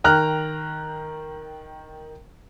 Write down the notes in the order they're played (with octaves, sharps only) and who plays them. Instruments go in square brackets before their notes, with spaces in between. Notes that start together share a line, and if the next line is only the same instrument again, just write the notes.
[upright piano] D#3 G5 A#5 F6 F#6